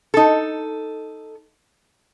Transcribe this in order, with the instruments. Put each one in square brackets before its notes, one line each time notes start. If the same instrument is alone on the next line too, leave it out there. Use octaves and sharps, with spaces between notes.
[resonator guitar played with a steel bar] D#4 A4